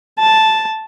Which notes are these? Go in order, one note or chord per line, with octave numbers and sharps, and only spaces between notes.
A5